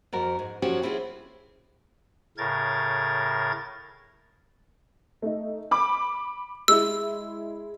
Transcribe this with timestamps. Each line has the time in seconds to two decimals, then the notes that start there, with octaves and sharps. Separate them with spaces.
0.13 F2 F#4 A#4
0.39 G#2
0.62 F#2 F3 C#4 F#4 G4
0.82 C4 E4 F4 G4 G#4
2.38 A2 C#3 A#4 G#6 A6
5.22 A3 D#4
5.71 B5 D6
6.68 G#3 E4 E6